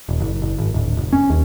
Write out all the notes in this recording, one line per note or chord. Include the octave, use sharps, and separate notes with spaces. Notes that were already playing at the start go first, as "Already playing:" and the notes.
D#1
F#1
F#1
G#1
D1
F1
C#4
D#2